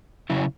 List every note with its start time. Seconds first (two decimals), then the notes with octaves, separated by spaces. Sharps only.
0.30 C#3 F#3 C#4 E4